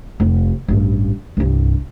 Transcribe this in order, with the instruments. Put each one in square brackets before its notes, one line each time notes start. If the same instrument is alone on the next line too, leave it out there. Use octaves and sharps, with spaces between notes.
[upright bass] F1
A1 G2
C2 G2